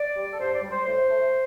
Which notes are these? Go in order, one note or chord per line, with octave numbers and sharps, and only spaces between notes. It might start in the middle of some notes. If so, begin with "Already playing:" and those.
Already playing: D5
G3
A4
G2 C5
D5
G3
C5
A2 C5
A3